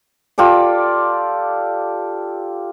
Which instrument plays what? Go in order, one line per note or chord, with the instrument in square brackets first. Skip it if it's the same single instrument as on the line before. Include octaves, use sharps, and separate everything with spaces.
[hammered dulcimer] F4 G4 A4 D5